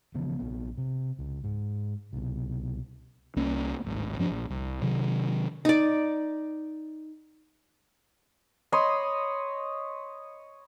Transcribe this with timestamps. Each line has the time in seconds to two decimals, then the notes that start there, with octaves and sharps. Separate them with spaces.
0.15 C#3 E3 F3 B3
0.39 A#1 B3
0.78 C3
1.19 C#2
1.44 G#2
2.13 C2 B2
3.36 C2 A#3 C#4
3.84 D1 G#1
4.18 G2 F3 B3 D4
4.30 A#1
4.50 C2
4.81 C3 D#3 F#3
5.65 D#4 D5
8.72 C#5 D#5 B5 C6